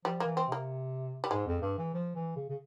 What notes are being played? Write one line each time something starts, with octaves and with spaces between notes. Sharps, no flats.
F3 G3
A#3
E3
C4
C3 A#3
G3
G#2 G#3
F2
G2
E3
F3
E3
C#3
C#3